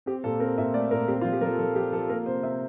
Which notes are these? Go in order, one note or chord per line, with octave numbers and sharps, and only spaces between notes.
C4 G4
A#2 A4
C4 A#4
A#2 E5
A3 D5
A#2 A#4
C4 G4
F4
F3
G4
F3 A4 A#4
F3 A4
F3 G4
F3 A4
A#3 A#4
C3 C5
C3 E5